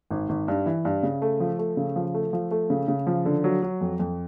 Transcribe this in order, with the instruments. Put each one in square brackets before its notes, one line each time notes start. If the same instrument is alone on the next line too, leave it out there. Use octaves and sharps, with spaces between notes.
[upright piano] G#1
G#1
G2
E3
G2
C#3
A3
F3
A3
C#3
F3
A3
F3
A3
C#3
C#3
F3
D3
F#3
F#3
F2
F2